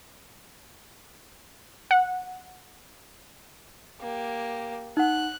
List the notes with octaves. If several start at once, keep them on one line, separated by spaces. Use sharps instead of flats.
F#5
A#3 G4
D#4 F#5 F#6